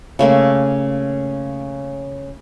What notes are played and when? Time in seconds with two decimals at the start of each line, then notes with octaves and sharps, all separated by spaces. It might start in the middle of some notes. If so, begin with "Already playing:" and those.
0.19 C#3 A3 A#3